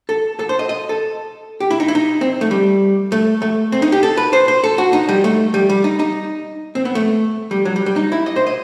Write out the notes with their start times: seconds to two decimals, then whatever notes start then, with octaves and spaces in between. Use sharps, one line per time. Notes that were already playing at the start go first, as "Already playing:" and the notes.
0.09 A4
0.39 A4
0.49 C5
0.59 D#5
0.69 D#5
0.89 A4
1.60 G4
1.71 E4
1.80 D#4
1.88 E4
1.95 D#4
2.21 C4
2.41 A3
2.51 G3
3.12 A3
3.42 A3
3.72 C4
3.82 D#4
3.92 G4
4.03 A4
4.17 B4
4.33 C5
4.48 C5
4.64 A4
4.78 F#4
4.93 D#4
5.09 G3
5.24 A3
5.54 G3
5.69 G3
5.84 D#4
5.99 D#4
6.75 C4
6.85 B3
6.95 A3
7.51 G3
7.65 F#3
7.76 G3
7.86 G3
7.96 D#4
8.12 E4
8.26 D#5
8.36 C5
8.46 D#5